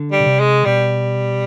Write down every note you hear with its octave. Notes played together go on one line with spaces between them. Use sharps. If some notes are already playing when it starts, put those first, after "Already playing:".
Already playing: D3
G3
B2
C3
G#3
B2 G3